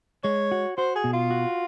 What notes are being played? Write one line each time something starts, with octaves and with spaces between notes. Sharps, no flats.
G#3 C#5
F#4
F#4 C5
G#4
B2
F4
F#4